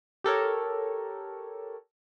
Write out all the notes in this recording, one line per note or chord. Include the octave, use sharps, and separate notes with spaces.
G4 A4 A#4 C#5